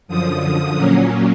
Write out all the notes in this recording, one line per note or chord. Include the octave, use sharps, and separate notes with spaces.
F#2 D3 F3 D#6
A#2 F#3 A#3 C#4